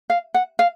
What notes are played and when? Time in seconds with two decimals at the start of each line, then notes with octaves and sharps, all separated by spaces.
0.10 F5
0.34 F#5
0.59 F5